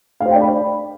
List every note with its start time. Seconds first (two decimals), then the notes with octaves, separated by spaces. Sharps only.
0.20 F5
0.26 C5
0.31 G5
0.36 D5
0.41 B5